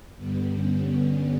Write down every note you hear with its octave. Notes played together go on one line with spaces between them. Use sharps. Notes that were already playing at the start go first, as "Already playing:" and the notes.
G2 D3 G3 B3
C#4
C#4